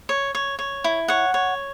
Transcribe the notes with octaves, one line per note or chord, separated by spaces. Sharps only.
C#5
C#5
C#5
E4
C#5 F#5
C#5